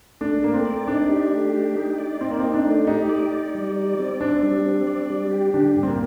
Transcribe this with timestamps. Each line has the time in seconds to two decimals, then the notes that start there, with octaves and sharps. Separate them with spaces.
0.21 A3 D4
0.43 A3 A#3
0.54 C4
0.65 D5
0.88 D4 D#4
1.09 G4
1.32 A3
1.54 G4
1.76 D#4
1.98 D5
2.21 C4 D#4
2.31 A#3
2.39 C4 D#4
2.54 D4
2.66 A3
2.87 D#4 G4
3.09 D5
3.32 D5
3.55 G3
3.76 D5
3.99 C4
4.20 C4 D4
4.43 G3
4.65 C4
4.87 D5
5.10 G3
5.31 G4
5.54 D3 D4
5.76 G2
5.83 C4
5.87 A#3